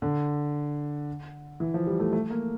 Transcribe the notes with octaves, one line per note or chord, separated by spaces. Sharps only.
D3
E3
F3
G3
A3
A3
A#3